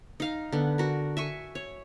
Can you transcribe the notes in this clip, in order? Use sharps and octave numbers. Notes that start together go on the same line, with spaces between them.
D#4 F5
D3 B3
F#4 A#4
E5 G#5 C#6
C#5